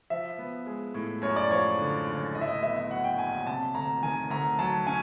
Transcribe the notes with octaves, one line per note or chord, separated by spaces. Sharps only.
F3 E5
B3
G#3
A2
F#2 C#5
D5
F3 C#5
D3
F#1
A2 D#5
E5
D#5
B3 E5
E5
F#3 F#5
G5
A#1 G#5
G#5
C3 A5
D2 A#5
D#3 G#5
D2 A#5
F#3 A5
C#4 G#5